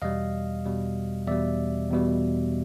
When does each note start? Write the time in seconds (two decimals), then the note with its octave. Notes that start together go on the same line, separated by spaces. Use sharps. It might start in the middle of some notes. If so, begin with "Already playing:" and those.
0.02 E2 B2 G3 D#5 F5
0.65 E2 B2 G3
1.27 E2 B2 G3 D5 E5
1.90 E2 B2 G3